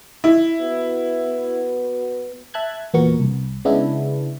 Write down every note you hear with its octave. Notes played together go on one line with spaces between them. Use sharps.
E4
B3 F#4 B4
E5 A5 F#6 G#6
E2 A#2 B3 F#4 A#4 C#6
C2
C#3 G#3 B3 D4 E4